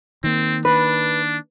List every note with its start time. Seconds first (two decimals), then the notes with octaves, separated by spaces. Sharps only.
0.24 D#3 A#3 C4
0.65 D4 B4